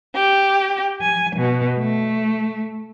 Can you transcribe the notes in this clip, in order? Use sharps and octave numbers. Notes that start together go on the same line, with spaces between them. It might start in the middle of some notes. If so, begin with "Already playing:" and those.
G4
G#5
B2
A3